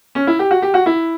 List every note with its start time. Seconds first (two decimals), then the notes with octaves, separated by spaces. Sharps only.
0.15 C#4
0.27 E4
0.39 G4
0.51 F#4
0.62 G4
0.74 F#4
0.86 E4